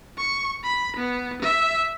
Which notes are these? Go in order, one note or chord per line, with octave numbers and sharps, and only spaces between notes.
C#6
B5
B3
E5